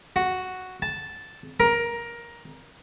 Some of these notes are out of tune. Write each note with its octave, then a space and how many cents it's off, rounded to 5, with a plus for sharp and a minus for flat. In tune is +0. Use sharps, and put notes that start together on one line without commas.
F#4 +0
A5 -5
A#4 +15